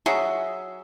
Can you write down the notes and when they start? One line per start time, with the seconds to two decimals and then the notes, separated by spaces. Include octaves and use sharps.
0.06 F#3 F#4 G#4 E5